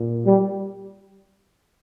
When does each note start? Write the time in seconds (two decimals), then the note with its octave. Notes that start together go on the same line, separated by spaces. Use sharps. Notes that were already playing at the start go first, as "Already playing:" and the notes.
Already playing: A#2
0.26 G3